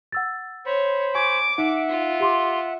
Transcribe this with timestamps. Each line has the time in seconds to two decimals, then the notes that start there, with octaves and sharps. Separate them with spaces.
0.12 F#5 E6 A6
0.66 C5 C#5 B5
1.15 G#5 C#6 D6 G#6
1.58 D#4 E5 F#5 D7
1.89 F4
2.20 G4 C6 D6